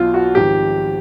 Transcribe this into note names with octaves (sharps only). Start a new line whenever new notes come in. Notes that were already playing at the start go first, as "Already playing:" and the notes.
Already playing: B1 B2 F4
F#4
G#1 G#2 F3 G4